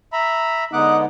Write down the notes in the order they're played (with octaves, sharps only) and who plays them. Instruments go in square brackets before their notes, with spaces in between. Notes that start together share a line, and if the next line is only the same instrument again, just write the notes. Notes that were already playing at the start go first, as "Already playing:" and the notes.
[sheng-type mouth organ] E5 A#5 B5
[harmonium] D3 G#3 B3 [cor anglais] D#4 [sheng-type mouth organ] F#5 D6 F#6